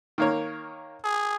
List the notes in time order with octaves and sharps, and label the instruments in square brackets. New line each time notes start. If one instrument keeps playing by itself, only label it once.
[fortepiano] D#3 A#3 C#5
[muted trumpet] G#4